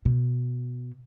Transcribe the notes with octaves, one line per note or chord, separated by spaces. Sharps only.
B2